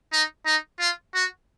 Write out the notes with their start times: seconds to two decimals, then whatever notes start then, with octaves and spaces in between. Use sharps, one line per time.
0.12 D#4
0.46 D#4
0.79 F4
1.14 F#4